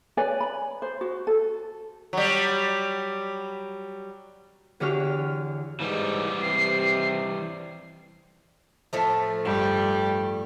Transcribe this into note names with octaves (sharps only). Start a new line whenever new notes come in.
B4 C#5 D5 G#5
B5
C5
F#4
A4
F#3 G3
E2 D3 F#4 G4 C#5 F6
G#2 E3 G3
C3 C7
A2 F3 A3
G2 G3